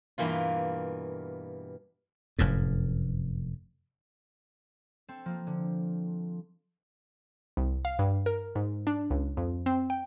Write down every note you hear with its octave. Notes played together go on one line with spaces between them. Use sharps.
G2 B2 E3 A#3 F4
F1 F#2 A2
C4 A4
F3 A#3
D3
C2
F5
G2
A#4
G#2
D4
C#2
F2
C4
G5